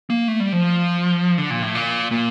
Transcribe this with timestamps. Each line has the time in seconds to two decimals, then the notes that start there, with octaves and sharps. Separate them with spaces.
0.10 A#3
0.28 A3
0.40 G3
0.52 F3
1.38 D3
1.50 A#2
1.62 A2
1.75 A#2
2.11 A#2